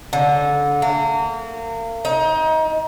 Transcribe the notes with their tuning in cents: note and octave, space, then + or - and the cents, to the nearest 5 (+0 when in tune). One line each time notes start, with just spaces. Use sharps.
D3 -20
A#3 -35
D#4 +25